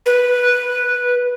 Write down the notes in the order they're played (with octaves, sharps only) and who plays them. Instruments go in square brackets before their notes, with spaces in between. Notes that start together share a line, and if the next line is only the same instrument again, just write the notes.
[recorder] B4